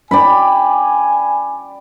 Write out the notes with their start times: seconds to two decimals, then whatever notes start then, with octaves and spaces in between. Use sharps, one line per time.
0.11 D5 G5 G#5 B5